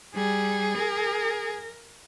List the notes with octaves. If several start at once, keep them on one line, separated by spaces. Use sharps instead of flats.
G3 G#4
A#4